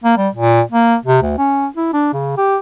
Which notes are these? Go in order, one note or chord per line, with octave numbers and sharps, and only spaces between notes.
A#3
G3
A#2
A#3
C3
D2
C#4
E4
D4
C#3
G4